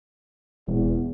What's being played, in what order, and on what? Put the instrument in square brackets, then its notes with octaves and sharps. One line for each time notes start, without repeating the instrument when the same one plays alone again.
[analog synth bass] E1 [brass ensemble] E2